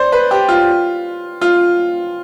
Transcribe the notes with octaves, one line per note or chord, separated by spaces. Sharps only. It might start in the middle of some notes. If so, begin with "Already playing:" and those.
Already playing: C5 D5
B4
G4
F4
F4